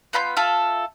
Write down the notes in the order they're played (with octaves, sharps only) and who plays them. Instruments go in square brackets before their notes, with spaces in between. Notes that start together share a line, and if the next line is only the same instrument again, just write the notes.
[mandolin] B3 F4 B5 G6
F4 A4 E5 F6